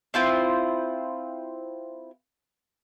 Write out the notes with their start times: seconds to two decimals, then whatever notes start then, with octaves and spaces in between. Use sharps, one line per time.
0.14 C4 E4 F4 C5